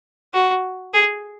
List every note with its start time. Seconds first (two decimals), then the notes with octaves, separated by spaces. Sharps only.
0.34 F#4
0.94 G#4